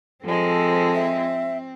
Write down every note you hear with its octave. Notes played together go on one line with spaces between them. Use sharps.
F3 G#3 C4 A4
E5